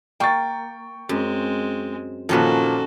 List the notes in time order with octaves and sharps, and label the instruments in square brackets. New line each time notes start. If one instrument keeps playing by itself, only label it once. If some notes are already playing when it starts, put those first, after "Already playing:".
[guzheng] A#3 [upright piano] G5 C#6 A6
[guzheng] F#2 [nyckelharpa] G#3 C4
[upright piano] A#2 F3 [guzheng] D#3 C#4 B4 [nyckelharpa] F#4 A4